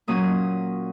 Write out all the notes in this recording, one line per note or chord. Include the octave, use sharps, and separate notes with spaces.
A#2 F#3 A#3 C#4 D#6